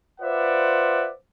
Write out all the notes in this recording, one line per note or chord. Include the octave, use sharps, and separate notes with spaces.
F4 B4 C5 D5 E5 F#5